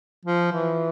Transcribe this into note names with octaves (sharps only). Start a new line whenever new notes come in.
F3
E3